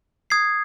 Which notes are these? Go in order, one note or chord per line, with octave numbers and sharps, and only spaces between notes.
D#6 G#6 C7